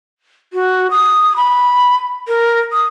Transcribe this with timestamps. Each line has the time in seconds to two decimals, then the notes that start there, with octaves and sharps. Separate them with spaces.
0.53 F#4
0.91 D#6
1.37 B5
2.28 A#4
2.72 D#6